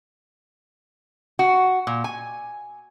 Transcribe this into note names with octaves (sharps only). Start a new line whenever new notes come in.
F#4
A#2
G#5